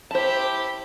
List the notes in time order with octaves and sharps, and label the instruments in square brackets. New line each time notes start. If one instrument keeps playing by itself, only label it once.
[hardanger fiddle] E4 G4 [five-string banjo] C5 A5